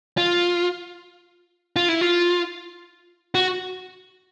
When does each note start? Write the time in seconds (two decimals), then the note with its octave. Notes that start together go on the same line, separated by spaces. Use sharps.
0.17 F4
1.76 F4
1.89 E4
2.01 F4
3.35 F#4